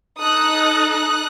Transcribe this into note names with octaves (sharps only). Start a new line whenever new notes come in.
D#4 A4 D#6 F#6
D#6 F#6